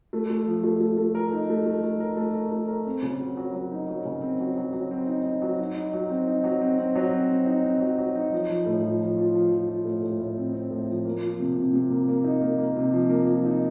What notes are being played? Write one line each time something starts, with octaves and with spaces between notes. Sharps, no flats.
A3
A3
F3
A3
A3
A3
A#4
D#4
A3
A3
A3
A#4
A3
A#4
A3
A#4
C4
C#3
F#3
F#3
F#3
D#4
F#3
C#3
C4
F#3
F#3
F#3
C4
D#4
D#4
F#3
D#4
D#4
F#3
C4
D#4
F#3
C4
C4
F#3
C4
C4
D#4
C4
F#3
F#3
D#4
F3
F3
A2
F3
F3
F4
F3
F3
F4
A2
A2
A2
C4
C4
A2
F3
A#3
F3
C3
C3
C3
A#3
A#3
D#4
A#3
A#3
C3
F3
A#3
F3
D#4